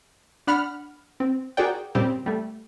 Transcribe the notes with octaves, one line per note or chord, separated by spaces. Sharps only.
D4 F#5 B5 F6
C4
F#4 G#4 A#4 D5 G5
A#2 C#3 G3 C4 G4
G3 A3